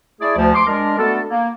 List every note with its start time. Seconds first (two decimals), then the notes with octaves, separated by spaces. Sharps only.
0.21 A3 E4 G#4 D5
0.36 D2 F3
0.54 C6 D6
0.67 G#3 D4 A#4
0.98 A3 B3 D4 F#4 A4
1.30 A#3